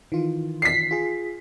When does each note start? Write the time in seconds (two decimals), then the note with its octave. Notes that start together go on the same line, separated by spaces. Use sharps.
0.12 D#3 E3 F4
0.62 B6 C7
0.91 F4 G#4